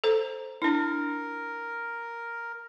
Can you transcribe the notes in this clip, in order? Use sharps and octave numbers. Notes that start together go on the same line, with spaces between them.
A4 C5 A#5
D4 E4 A#4